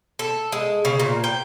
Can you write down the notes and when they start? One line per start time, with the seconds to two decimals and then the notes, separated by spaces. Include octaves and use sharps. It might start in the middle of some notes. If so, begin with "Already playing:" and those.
0.19 A4
0.52 G#3
0.85 C#3
1.00 A#2
1.24 G5